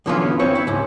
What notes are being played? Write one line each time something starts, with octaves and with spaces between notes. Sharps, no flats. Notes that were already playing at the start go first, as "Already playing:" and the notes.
F#2 D3 E3 B3 C#4 F4
C4 E4 C#5
E4
C#2 G#2